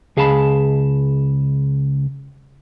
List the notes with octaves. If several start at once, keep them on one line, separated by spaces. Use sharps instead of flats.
C#2 G#4 F5 A5 B5